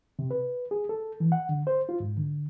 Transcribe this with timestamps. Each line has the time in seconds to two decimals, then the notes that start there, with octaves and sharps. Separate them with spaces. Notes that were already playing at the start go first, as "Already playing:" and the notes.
0.19 C3
0.31 B4
0.71 G#4
0.89 A4
1.20 E3
1.32 F#5
1.49 D3
1.67 C5
1.89 F4
2.00 G#2
2.17 D3